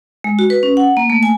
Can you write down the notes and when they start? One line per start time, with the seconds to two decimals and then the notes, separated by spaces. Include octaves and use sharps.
0.24 G#3
0.39 F#4
0.50 B4
0.63 C#4
0.77 F#5
0.97 A#3
1.10 A3
1.23 G#5